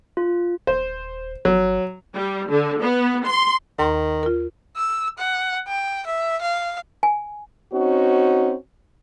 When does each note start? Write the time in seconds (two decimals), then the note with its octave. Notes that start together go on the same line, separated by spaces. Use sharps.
0.17 F4
0.67 D#1 C5
1.45 G1 F#3
2.15 G3
2.50 D3
2.81 B3
3.27 C6
3.79 D#2 D#3 A#5 C6
4.23 F4 A#4
4.76 E6
5.18 F#5
5.68 G5
6.06 E5
6.41 F5
7.03 G#5
7.73 C4 C#4 D#4 F#4